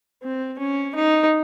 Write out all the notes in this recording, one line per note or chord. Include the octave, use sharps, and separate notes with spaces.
C4
C#4
D#4